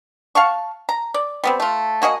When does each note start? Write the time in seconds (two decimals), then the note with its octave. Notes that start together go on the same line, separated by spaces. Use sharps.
0.35 F5 F#5 A5 C#6
0.89 A#5
1.14 D5
1.44 G3 B3 C4
1.60 A3 F4
2.02 A#3 F#4 G#4 D#5